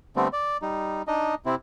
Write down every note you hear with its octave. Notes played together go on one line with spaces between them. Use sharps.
D3 G3 A3 B3 C4
D5
G3 D#4
D4 D#4 D#5
C3 C4 E4